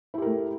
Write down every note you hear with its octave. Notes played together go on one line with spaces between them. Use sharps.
A3 E4 G4 A#4